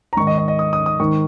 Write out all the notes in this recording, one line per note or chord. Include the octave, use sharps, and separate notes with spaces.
A#5
G#2 D#3 C#6
D#5
D#5
D#5
D#6
D#6
D#6
G#2 D#3 C#6